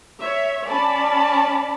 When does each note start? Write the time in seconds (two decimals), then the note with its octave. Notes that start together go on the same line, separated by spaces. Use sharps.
0.19 C#5 E5
0.68 C#4 D5 A5 B5